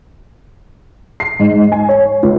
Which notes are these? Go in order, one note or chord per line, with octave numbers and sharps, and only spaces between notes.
C7
G#2
G#5
C#5
C#2